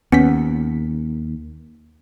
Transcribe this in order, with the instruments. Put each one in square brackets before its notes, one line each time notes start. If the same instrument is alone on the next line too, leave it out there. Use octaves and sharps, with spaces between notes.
[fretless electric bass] D#2 [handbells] B3 C#4 B6